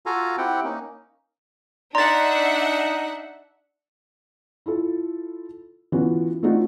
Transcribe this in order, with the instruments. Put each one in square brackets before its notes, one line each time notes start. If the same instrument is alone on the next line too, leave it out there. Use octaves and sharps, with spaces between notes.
[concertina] F4 F#4 A4 F5 G#5 A#5
C4 E4 G4 F#5 G5
A#3 C#4 D#4
[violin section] D4 E5 F#5 [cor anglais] D#4 [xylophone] D5 C6 [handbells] A#5 A6
[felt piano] E4 F4 A4
E3 B3 C#4 F4 F#4
A3 C4 D4 D#4 F4 F#4